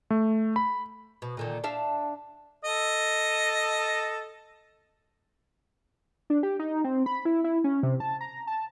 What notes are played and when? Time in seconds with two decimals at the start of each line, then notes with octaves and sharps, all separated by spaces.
0.10 A3
0.56 B5
1.22 B2
1.37 A#2 D3 D#3
1.64 D4 E5 F5
2.64 A4 D#5
6.30 D4
6.43 G4
6.59 D#4
6.84 C4
7.06 B5
7.25 E4
7.44 E4
7.64 C#4
7.83 C3
8.00 A5
8.21 A#5
8.47 A5